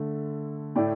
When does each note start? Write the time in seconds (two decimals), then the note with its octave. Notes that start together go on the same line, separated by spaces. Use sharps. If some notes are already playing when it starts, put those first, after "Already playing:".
Already playing: D3 A3
0.75 A2 A3 D5 G5